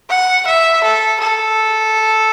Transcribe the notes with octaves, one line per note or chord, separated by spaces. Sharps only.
F#5
E5
A4
A4